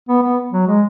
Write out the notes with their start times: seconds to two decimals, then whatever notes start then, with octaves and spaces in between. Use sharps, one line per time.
0.09 B3
0.23 B3
0.53 F#3
0.67 G#3